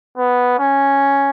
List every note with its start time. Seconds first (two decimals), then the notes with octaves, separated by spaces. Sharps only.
0.18 B3
0.59 C#4